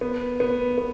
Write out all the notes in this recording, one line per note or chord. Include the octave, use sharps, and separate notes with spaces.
B3
B3
B3